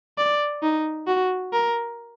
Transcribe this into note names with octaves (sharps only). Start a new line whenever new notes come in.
D5
D#4
F#4
A#4